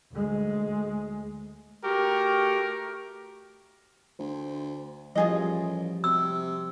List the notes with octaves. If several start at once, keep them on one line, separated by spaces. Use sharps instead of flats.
D2 G#3
A3 F#4 G4 A#4
D2 C5
A1 F3 G3 E4 F4 G#4 D#5
C3 F#4 E6